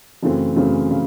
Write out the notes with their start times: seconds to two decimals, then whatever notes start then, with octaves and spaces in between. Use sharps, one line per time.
0.23 F#2 C#3 E3 A3 C4
0.56 F#2 C#3 E3 A3 C4
0.91 C#3